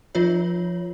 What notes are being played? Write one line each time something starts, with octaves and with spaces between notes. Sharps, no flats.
F3 F4 C#5